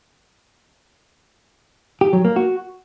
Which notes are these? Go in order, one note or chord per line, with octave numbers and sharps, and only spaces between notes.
G4
F#3
A#3
F#4